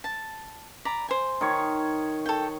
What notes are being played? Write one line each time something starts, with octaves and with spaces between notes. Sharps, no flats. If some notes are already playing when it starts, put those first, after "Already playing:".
A5
D5 A#5 B5
C5 G#5
D#3 C#5
A4 G5